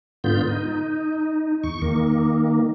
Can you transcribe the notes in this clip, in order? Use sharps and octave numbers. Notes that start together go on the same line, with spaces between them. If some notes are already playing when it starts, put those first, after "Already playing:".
G#2 D3 B3 F4 G6
D#4
E2 C#6
D#3 A#3